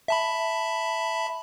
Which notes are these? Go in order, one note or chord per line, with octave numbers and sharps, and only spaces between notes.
E5 A5 B5